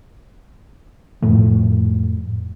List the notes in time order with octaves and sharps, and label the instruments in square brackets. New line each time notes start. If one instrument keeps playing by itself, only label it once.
[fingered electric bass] F2 A2 F3 A3